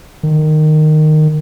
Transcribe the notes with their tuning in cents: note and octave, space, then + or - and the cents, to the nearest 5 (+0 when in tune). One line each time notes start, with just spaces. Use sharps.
D#3 -15